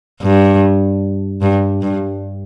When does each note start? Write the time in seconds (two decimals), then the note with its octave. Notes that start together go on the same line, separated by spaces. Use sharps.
0.21 G2
1.42 G2
1.82 G2